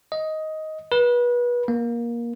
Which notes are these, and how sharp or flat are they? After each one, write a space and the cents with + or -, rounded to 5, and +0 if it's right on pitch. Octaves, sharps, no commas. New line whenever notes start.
D#5 +10
B4 -30
A#3 +20